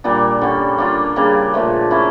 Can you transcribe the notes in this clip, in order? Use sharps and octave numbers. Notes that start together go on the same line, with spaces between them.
A#2 G3 A#3 D4
D3 G3 C#4
A#3 D4 F4
C#3 G3 A#3 D4
A#2 F3 A3
A#3 C#4 E4